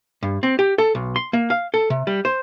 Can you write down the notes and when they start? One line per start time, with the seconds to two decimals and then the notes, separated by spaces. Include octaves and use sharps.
0.23 G2
0.43 C4
0.59 G4
0.78 A4
0.95 B1
1.16 C6
1.33 A#3
1.50 F5
1.74 A4
1.90 C3
2.07 G3
2.25 C5